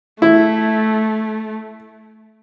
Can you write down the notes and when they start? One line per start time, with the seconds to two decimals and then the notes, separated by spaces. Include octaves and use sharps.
0.22 A3 E4